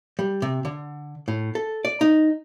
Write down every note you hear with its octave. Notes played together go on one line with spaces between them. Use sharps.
G3
C3
D3
A2
A4
D5
D#4